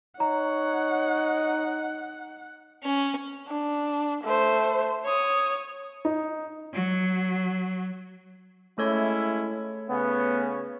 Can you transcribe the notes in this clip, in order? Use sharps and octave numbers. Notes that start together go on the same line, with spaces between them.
D#4 C#5 F#5 A#5
C#4
D4
A3 C5
C#5 D#6
D#4
F#3
G#3 A3 C#4 E4 A4 C#5
C#3 B3 C#4